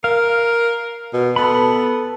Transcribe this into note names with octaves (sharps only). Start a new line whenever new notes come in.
A#4 F5
B2
B3 A4 B5